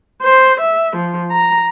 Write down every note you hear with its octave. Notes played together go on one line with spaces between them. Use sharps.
C5
E5
F3
A#5